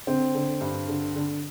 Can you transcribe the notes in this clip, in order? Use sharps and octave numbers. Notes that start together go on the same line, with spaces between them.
D3 C4
D3
G2
D3
D3